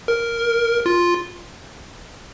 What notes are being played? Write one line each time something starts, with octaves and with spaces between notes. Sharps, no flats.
A#4
F4